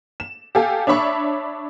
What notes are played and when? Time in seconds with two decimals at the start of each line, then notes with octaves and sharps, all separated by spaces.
0.20 E7
0.55 G4 A4 F5 G#5
0.87 D4 C#5 E5 B5 C#6